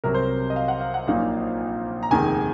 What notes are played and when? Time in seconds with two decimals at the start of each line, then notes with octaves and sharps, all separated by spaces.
0.04 C2 C3 F#3 A#4
0.14 C5
0.25 A#4
0.50 D#5
0.56 F5
0.68 F#5
0.81 F5
0.94 F#5
1.07 A#1 A#2 F#3 A#3 D#4 F5
2.03 A#5
2.11 F1 D#2 D#3 G#3 G#5